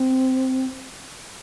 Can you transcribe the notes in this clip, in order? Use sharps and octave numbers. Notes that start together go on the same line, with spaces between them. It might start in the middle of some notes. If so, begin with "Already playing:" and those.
Already playing: C4